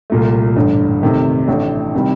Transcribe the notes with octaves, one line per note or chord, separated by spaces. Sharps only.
C2 A#2 A3
A1 G2 D3
C3 D#3 A3
A1 A2 A3 D4
C3 D#3 G3 C4